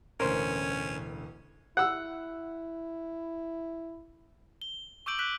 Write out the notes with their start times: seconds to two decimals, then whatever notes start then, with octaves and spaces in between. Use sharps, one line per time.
0.20 E1 A1 D2 C#4 A#4 C5
1.77 E4 F#5 E6
4.62 G7
5.06 C#6 D6 E6 G6 D7 F#7
5.19 D6 F#6 B6 F#7